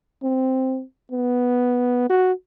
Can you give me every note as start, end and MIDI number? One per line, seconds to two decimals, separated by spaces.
0.23 0.82 60
1.12 2.07 59
2.10 2.33 66